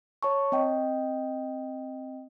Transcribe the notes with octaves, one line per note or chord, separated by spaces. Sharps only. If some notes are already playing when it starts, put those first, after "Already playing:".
C#5 A5 C#6
C4 D#5 G5